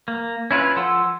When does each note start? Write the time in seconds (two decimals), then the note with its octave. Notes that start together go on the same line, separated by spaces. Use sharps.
0.08 A#3
0.51 C#4 E4 F4 B4
0.76 F3 A4 F#5 C6 E6